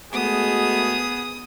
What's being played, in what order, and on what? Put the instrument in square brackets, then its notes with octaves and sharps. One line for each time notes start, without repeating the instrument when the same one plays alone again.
[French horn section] G#3 A3 F#4 [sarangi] B3 [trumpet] G#4 [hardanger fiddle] D#6